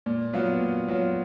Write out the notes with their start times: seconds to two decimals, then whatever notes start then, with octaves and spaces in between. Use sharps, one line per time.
0.06 A#2
0.33 F#3 B3 F4
0.61 A#2
0.88 F#3 B3 F4